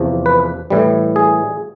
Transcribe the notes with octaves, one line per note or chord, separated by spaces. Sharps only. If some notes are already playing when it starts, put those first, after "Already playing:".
Already playing: E2 C3 F3
B4
A2 E3 G3
G#4